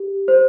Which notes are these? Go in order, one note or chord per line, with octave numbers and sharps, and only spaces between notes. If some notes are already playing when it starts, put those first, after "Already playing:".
Already playing: G4
C5